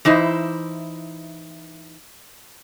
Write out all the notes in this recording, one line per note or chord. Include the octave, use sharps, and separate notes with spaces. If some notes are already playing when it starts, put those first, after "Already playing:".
E3 D#4 E4 C5